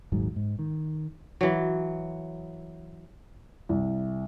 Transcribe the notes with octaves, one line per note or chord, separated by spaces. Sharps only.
D#1 G#1 G#2 F#3
G#2
D#3
E3 F#3
C2